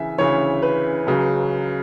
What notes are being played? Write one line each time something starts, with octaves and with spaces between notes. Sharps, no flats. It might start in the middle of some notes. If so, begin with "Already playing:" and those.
Already playing: D2 C#3 E3 E5 G#5
D2 C#3 E3 C#5
B4
C#2 C#3 F#3